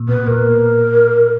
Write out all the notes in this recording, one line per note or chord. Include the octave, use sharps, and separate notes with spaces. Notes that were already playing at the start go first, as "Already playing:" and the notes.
Already playing: A#2
B2 B4
A#2 A#4